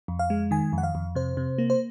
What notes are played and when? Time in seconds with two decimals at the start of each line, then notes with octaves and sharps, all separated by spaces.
0.08 F2
0.19 F5
0.30 G#3
0.51 D#3 G#5
0.73 F2
0.78 F#5
0.83 F5
0.95 F2
1.15 C3 C5
1.37 C3
1.58 A#3
1.70 C5